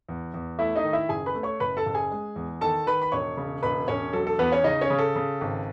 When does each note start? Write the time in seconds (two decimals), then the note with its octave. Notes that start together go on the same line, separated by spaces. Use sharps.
0.09 E2
0.34 E2
0.59 A3 E4 E5
0.76 D#4 D#5
0.84 D#3
0.93 E4 E5
1.09 F#1 G#4 G#5
1.26 B4 B5
1.35 A3
1.43 C#5 C#6
1.60 F#1 B4 B5
1.77 A4 A5
1.86 F#1
1.95 G#4 G#5
2.12 G#3
2.36 E2
2.61 D#3 A4 A5
2.86 D#3 B4 B5
3.02 B5
3.12 E1 C#5 C#6
3.37 C#3
3.63 E1 B4 B5
3.88 E1 C#4 C#5
4.13 F#3 A4
4.27 A4
4.39 E2 B3 B4
4.52 C#4 C#5
4.64 C#3 D#4 D#5
4.81 C#4 C#5
4.90 C#3
4.98 A4
5.16 C#3
5.41 G#1